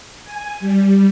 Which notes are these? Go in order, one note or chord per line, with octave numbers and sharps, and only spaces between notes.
G#5
G3